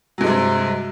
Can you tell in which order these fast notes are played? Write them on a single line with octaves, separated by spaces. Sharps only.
F#3 G2 G#3 C3